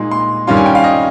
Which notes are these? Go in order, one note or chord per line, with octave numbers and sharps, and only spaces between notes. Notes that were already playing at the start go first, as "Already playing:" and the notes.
Already playing: A#2 G#3 D#4 C6
C6
G2 D#3 G3 C#4 F4 C6
G#5
G5
F5
D#5